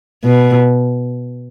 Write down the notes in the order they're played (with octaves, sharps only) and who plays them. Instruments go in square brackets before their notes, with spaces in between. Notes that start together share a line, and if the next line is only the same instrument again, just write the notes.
[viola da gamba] B2